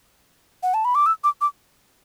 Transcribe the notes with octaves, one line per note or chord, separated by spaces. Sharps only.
F#5
A5
B5
D6
E6
D6
D6